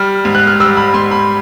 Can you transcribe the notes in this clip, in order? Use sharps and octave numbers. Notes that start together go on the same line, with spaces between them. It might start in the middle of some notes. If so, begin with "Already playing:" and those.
Already playing: G3 F6
G#2
F#6
F6
G3 E6
B5
G#2 C6
B5